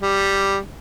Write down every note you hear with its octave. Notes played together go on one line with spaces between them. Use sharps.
G3